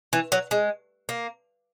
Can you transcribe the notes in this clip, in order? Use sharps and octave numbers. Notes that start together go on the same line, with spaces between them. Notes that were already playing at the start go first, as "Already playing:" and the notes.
E3
F#3
G#3
A#3